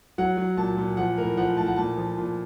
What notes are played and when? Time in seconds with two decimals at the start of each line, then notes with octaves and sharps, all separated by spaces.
0.18 F#3 F#5
0.37 F#3
0.57 A#2 A5
0.77 A#2
0.97 F3 F#5
1.18 A2 A#4
1.37 F3 F#5
1.57 A2 A5
1.67 F#5
1.76 A#2 A5
1.97 F3
2.17 A#2